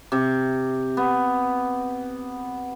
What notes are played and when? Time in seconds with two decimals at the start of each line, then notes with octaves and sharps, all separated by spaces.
0.12 C3
0.97 B3